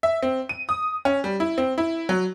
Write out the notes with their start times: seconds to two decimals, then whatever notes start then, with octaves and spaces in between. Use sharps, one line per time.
0.03 E5
0.23 C4
0.49 D#7
0.69 D#6
1.05 C#4
1.24 G3
1.40 E4
1.58 C4
1.78 E4
2.09 F#3